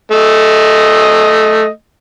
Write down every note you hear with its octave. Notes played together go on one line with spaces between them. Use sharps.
A3 D#5